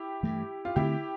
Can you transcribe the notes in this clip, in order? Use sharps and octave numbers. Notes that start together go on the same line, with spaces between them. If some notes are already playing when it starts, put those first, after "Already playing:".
Already playing: E4 G4
G2 E3 A3
F4
D3 A3 C4 E4 G4